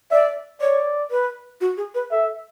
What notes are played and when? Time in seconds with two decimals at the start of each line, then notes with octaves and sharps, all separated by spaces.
0.11 D5 E5
0.61 C#5 D5
1.11 B4
1.61 F#4
1.77 G#4
1.95 B4
2.11 A4 E5